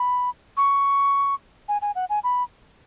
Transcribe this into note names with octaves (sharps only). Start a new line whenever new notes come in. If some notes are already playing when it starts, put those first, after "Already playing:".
Already playing: B5
C#6
G#5
G#5
F#5
G#5
B5